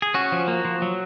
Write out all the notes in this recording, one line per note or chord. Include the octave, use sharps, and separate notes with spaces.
G#4
C#4 F#4
F3
A#3
F3
F#3